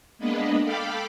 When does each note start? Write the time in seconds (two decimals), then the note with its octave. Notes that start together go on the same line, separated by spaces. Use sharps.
0.19 G#3 A#3 B3 D4 B4 D#5
0.63 A4 F5 G5 B5 D6